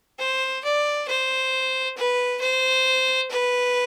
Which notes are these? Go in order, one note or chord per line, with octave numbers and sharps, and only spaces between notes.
C5
D5
C5
B4
C5
B4